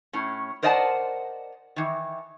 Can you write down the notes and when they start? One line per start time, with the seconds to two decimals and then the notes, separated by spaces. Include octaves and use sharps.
0.13 A2 C#4
0.63 A#4 C5 D5 D#5 F#5 A5
1.76 D#3 E3